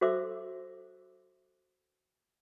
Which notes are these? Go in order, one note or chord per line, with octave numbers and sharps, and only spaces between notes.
F#4 A4 C5 E5 D6 E6